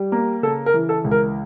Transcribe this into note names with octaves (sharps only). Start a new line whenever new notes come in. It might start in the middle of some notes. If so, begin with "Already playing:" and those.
Already playing: G3
A#3
C#3 A4
A#4
E3
A4
C#2
A#4